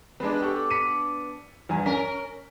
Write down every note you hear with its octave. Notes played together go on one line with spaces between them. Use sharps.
G#3 B3 D4 B4
G4 A4 C#6
B6 C#7 D#7
E2 G2 G#5
C#4 A#4 B6